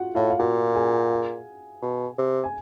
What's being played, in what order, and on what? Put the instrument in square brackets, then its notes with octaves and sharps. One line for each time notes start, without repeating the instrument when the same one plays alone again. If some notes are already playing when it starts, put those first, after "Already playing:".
Already playing: [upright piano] F4 F#4 F#5
[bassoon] A2 [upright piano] F4 F5
[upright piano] F5
[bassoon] A#2 [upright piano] F#4 F#5
[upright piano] G#4 G#5
[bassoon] B2
C3
[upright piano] G#5